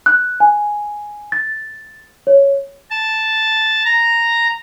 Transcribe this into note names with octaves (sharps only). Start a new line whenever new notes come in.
F#6
G#5
A6
C#5
A5
A#5